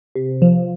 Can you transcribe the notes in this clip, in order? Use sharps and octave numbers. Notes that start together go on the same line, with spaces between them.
C3
F3